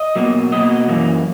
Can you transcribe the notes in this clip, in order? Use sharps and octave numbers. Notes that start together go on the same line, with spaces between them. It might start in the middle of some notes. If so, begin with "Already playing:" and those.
Already playing: D#5
B2 F#3 A#3
B2 F#3 A#3 D#5
F#2 E3 A#3